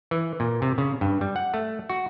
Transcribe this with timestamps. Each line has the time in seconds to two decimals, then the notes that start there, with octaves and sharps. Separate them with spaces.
0.11 E3
0.40 A#2
0.62 C3
0.78 C#3
1.01 G2
1.21 G3
1.36 F#5
1.54 A3
1.89 F#4